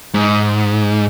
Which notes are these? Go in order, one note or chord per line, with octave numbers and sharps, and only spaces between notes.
G#2